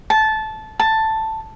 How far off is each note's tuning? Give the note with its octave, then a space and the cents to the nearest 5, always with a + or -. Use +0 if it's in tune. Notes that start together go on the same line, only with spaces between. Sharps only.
A5 -15
A5 +5